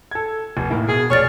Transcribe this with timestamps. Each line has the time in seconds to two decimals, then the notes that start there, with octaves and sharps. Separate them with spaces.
0.11 A4 G#6
0.57 F1
0.70 A2 A#3 E4
0.89 B2 G#4
1.10 F1 C#5 D5 C#6 F6 A6